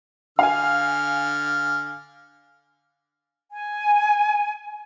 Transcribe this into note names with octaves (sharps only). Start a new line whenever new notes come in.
D3 F5 G#5 F6
G#5